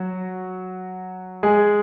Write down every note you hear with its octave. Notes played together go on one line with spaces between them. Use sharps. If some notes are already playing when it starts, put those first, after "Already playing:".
Already playing: F#3 F#4
G#3 G#4